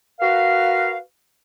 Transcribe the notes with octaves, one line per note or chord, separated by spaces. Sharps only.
F#4 A#4 B4 F5